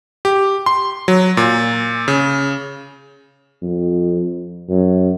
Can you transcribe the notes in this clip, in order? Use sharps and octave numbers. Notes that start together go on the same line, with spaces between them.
G4
C6
F#3
A#2
C#3
F2
F#2